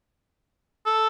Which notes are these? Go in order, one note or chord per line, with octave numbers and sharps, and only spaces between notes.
A4